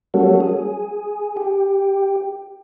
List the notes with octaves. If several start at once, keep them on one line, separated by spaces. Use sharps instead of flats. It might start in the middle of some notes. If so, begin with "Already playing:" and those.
F#3 G3 A#3 C#4 F#4 A4
G#4
G4